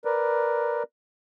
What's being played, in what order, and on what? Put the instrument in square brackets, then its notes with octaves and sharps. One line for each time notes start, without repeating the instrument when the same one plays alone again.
[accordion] A#4 B4 D5